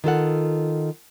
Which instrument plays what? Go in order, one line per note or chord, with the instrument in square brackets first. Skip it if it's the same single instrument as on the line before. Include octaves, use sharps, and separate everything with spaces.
[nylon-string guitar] D#3 F4 A4 F#5